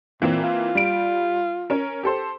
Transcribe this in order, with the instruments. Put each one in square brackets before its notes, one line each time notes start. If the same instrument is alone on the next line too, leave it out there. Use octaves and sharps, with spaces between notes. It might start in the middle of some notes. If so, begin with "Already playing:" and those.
[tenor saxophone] A#2 [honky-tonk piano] E3 A#3 C4
[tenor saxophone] F4
[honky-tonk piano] G3 D7
C#4 A#4
G4 A4 C5